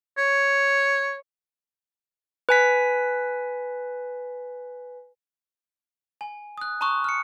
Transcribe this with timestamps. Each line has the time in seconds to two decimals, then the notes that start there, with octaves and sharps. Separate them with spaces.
0.18 C#5
2.49 B4 G#5 B6
6.21 G#5
6.58 D#6 F#6
6.81 A5 A#5 C6 C#6 D#6 F#6
7.04 F6 C#7